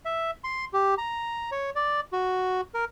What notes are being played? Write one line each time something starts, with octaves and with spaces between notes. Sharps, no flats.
E5
C6
G4
A#5
C#5
D5
F#4
A#4